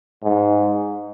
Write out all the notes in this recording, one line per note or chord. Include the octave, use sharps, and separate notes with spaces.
G#2